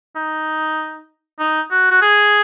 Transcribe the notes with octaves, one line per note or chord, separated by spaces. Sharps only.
D#4
D#4
F#4
F#4
G#4